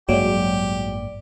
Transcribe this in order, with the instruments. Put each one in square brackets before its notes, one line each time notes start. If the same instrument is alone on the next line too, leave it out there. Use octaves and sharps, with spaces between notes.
[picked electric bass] A1 G2 A#3 [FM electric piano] F#3 G#3 [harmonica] G4 [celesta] D5 D7